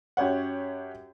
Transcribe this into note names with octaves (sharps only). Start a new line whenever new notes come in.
F#2 G4 C#5 F#5